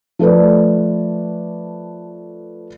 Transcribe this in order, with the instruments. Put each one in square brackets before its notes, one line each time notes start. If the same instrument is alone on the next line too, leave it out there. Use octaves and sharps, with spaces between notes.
[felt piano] F3 A3 A4 B4 D5